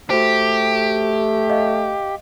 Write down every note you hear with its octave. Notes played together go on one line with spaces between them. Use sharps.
A3 F#4 G4 C5
D#5 F5